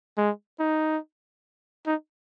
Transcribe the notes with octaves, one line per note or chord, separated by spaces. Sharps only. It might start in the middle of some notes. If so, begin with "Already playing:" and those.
G#3
D#4
D#4